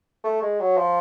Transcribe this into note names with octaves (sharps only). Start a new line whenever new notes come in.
A3
G#3
F#3
F3